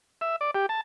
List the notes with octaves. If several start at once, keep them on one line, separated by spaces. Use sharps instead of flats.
E5
D5
G4
A5